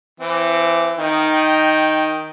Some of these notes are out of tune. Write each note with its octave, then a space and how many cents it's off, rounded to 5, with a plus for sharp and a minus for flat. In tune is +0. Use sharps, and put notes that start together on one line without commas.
E3 +25 C4 +0
D#3 +0 D#5 +0 G5 +0